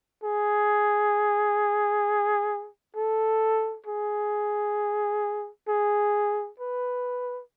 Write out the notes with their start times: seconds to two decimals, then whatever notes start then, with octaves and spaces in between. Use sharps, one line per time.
0.24 G#4
2.96 A4
3.86 G#4
5.68 G#4
6.60 B4